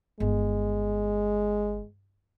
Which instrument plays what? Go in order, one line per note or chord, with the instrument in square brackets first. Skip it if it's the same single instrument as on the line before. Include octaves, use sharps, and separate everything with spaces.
[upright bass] G1 [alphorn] G#3